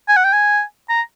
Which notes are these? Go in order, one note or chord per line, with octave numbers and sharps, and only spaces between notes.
G#5
F#5
G5
G#5
A#5